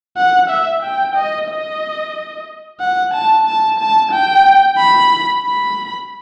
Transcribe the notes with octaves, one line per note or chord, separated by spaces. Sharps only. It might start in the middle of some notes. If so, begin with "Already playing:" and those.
F#5
E5
G5
D#5
D#5
F#5
A5
A5
A5
G5
B5
B5